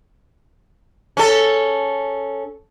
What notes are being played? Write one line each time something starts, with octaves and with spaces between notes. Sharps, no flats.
C#4 A4